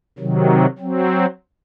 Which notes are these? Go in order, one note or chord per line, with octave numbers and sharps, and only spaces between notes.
C3 D#3 F#3
F#3 C4